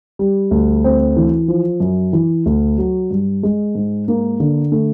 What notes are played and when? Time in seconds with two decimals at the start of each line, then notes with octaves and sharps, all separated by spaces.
0.19 G3
0.51 D2
0.84 C4
1.17 E3
1.48 F3
1.80 F#2
2.13 E3
2.46 D2
2.78 F#3
3.11 G2
3.43 G#3
3.75 G#2
4.08 A#3
4.40 D3
4.72 A3